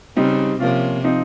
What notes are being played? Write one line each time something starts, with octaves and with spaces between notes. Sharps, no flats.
C#3 G3 C4 D#4
C3 F3 A#3 C#4 F4
F3 C4 D#4